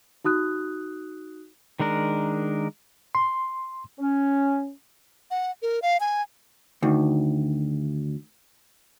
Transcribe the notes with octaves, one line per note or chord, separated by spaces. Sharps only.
D#4 F#4 D#6 F#6
D#3 G#3 D4 A#4
C6
C#4
F#5
A#4
F5
G#5
D2 D#3